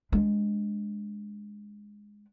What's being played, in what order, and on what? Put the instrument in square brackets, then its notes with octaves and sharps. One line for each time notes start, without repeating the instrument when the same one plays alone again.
[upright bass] G#3 D4